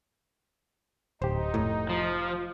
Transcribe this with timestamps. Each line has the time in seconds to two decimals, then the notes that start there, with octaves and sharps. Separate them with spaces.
1.22 D1 D#4 G4 C5
1.54 F1 A2
1.89 F3